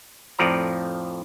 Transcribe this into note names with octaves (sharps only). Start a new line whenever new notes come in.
F2 A2 F3 D5 A#5